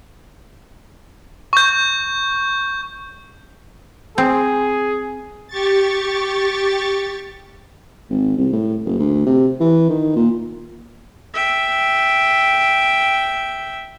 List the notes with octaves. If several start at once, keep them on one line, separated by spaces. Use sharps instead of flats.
C#6 G6
C4 G#4
G4 C#6 A6
G#1
C2
A2
F#1
D2
C3
E3
D#3
A#2
E5 G5